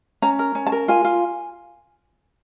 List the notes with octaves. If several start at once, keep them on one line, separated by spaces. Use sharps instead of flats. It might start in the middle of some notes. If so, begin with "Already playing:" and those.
C#4 A#5
A#4
C#4
A5
A#4
F4 G#5
F4